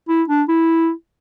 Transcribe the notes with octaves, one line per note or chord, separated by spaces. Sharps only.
E4
D4
E4